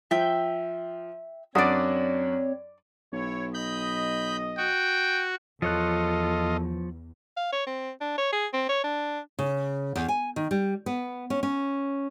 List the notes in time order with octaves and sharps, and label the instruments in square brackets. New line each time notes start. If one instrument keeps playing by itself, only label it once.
[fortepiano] F3 [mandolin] E5 G5 G6
[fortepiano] F#2 D4 F#4 [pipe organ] C4 C#5 [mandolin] D5 D#6
[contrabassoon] B1 [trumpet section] E4 C#5
[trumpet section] D#5 [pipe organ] B5 G6
[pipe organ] F#4 [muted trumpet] G5
[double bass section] E2 [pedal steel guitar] F3 C#5 F#6 [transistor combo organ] F4 D#5 [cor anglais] A4
[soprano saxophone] F5
C#5
C4
D4
C#5
G#4
C4
C#5
D4
[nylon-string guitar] C#3
E2
G#5
D#3
G3
B3
C#4
C#4